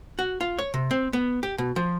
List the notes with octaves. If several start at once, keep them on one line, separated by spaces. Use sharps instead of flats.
F#4
F4
C#5
C3
C4
B3
G4
B2
F3